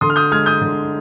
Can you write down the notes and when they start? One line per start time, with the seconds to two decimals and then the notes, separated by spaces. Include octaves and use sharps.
0.01 D3 C6 D#6
0.10 F6
0.16 D#6 G6
0.31 G#3 F6 G#6
0.46 D#6 G6
0.61 D3